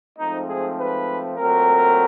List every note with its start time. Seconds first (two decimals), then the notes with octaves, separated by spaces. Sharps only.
0.18 G#2 F3 A3 C4 D#4
0.48 G#4
0.78 B4
1.36 A#2 F#3 A3 C4 A#4